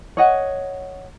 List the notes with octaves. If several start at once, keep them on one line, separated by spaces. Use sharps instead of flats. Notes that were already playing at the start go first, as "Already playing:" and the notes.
C#5 D#5 F#5